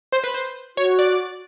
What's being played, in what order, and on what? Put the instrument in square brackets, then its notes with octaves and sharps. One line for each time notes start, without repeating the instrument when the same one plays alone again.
[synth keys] C5
B4
C5
[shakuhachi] F#4 [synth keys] C#5
[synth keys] D5